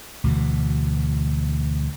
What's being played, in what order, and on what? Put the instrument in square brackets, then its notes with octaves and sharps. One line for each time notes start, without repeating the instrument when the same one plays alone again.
[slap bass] D2 B2 E3